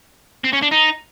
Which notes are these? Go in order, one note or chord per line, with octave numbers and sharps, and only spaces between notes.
C4
C#4
D4
D#4